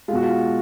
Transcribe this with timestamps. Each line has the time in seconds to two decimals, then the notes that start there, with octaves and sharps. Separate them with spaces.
0.08 G#3 F4
0.13 B2 F#4
0.23 F4